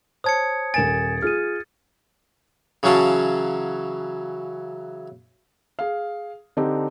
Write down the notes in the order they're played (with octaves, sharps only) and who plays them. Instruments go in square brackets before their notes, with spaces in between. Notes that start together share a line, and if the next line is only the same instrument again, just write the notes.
[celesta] C5 C#5 A5 [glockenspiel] D#6 G#6 C#7
[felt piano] D#1 A#4 D7 [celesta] G#5 E7 [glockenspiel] A6
[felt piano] F4 G#4 [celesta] F6 D#7
[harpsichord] C#3 E3 F#3 C#4 F5 A5
[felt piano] G#4 F5
D3 C4 D4 D#4 G4